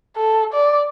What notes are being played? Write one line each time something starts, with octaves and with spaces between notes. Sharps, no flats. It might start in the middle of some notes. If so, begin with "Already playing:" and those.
A4
D5